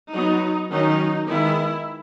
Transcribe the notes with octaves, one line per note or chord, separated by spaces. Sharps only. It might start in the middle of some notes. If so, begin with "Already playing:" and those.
F#3 B3 D#4
D#3 F#3 C#4 D#4
D#3 G#3 B3 E4